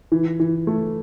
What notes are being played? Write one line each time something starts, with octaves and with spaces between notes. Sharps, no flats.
E3
E3
A3